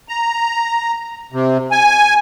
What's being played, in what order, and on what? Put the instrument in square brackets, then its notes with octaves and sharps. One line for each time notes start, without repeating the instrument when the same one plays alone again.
[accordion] A#5
C3
G#5